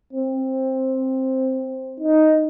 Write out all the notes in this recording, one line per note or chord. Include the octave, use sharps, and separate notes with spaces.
C4
D#4